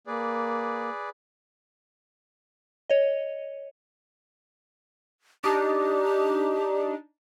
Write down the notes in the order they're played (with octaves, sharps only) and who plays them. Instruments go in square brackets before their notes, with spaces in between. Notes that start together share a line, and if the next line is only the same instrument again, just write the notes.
[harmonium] A#3 [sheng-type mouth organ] G#4 B4 D5
[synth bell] C#5 D#5
[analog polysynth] D4 D#4 [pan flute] G4